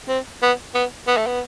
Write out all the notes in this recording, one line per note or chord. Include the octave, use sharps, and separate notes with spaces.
C4
B3
B3
B3
A3
B3